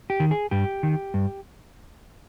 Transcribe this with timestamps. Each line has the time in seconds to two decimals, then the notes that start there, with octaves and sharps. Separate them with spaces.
0.10 G4
0.20 D#3
0.31 G#4
0.51 G2 G4
0.83 D#3
1.14 G2